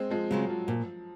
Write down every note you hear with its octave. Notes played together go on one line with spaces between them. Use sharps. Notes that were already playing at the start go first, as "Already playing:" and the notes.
Already playing: G#3 C4
F3 G#3
C#3 F#3 G#3 C4
F3
A#2 F3